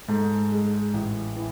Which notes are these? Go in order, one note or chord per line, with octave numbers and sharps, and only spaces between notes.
G#2 A4
G#3
A1
E3